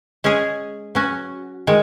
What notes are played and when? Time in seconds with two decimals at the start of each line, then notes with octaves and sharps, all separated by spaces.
0.24 G#3 C#4 G#4
0.95 F#3 C#4 F#4
1.67 D#3 G#3